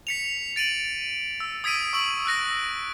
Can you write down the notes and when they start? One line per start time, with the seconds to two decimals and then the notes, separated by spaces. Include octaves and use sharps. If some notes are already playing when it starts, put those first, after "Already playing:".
0.07 B6 C#7 F7
0.56 A6 D7 D#7 F#7
1.40 E6
1.64 D#6 G#6 B6 D7 D#7
1.93 C#6 E6 D7 F#7
2.25 E6 F#6 A#6 D7